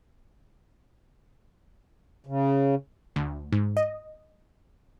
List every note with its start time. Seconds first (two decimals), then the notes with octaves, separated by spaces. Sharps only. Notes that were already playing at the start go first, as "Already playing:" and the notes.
2.26 C#3
3.16 D2
3.52 G#2
3.77 D#5